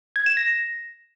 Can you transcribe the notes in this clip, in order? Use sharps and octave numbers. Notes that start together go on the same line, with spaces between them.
G#6
E7
A#6